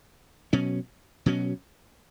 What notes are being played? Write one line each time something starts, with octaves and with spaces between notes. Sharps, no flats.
B2 F#3 C#4
B2 F#3 C#4